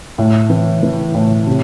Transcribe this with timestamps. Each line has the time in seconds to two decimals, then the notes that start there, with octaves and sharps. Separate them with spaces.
0.18 A2
0.50 E3
0.83 E3
1.15 A2
1.47 C3